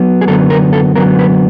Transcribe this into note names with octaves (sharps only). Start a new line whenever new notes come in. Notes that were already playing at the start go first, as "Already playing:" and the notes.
Already playing: F#3 B3
G#4
F#2 D3 F#3 B3 A4
A#4
A4
F#2 D3 F#3 B3 A#4
B4